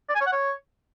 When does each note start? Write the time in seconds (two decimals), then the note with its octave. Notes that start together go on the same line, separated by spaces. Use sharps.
0.09 D5
0.15 G#5
0.21 C#5
0.27 F#5
0.32 C#5